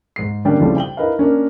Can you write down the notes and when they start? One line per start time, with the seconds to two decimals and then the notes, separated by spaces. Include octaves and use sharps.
0.16 G#2 C7
0.45 D3 G3 A#3 C#4 D4 G4
0.60 F2 C#3 F3 G3 A3 E4
0.76 G5 F#7 G7
0.97 D#4 E4 A#4 B4 D#5 F5
1.18 A#3 C#4 D4 A#4